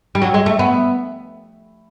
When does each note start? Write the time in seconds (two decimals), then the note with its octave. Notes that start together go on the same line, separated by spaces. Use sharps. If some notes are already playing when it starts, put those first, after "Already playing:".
0.15 G3
0.22 F#3
0.34 G#3
0.46 A3
0.59 B3